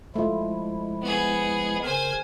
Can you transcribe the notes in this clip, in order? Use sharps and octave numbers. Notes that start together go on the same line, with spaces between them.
F3 G#3 A3 E4 F4
B3 G#4
C#3 A#4 C5 G#5